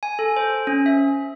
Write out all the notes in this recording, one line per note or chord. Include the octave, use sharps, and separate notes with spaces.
G#5
A4
C5
C#4
E5